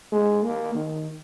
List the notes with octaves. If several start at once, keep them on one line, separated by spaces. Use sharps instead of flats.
G#3
A#3
D#3